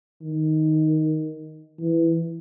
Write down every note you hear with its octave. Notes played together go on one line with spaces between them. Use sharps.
D#3
E3